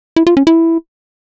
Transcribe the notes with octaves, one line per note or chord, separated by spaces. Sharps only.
E4
F4
C#4
E4